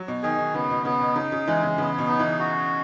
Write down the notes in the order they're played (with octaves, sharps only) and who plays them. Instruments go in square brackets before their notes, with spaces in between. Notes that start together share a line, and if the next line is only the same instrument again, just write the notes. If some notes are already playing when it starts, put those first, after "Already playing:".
Already playing: [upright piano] F#3
B2
[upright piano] D#3 [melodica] G#4
[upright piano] D#3
[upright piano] C#3 [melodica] B3
[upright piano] B2
[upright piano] C#3 [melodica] B3
[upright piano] B2
[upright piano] C#3 [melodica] D#4
[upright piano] C#3
[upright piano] E3 [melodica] G#3
[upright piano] C#3
[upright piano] C#3 [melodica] B3
[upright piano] B2
[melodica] D#4
[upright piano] E3
[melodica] F#4